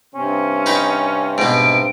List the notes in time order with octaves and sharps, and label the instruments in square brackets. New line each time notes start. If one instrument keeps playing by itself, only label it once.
[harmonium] G2 C3 C4 [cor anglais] C#4
[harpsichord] D#4 B4 G5
[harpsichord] G#2 B2 [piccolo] D7